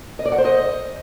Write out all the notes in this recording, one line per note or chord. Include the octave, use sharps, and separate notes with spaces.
D#5
D5
F#5
C5
D#5